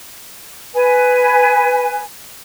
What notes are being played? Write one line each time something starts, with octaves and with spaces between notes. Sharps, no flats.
B4 G#5